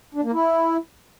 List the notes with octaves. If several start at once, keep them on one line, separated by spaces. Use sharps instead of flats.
D4
A#3
E4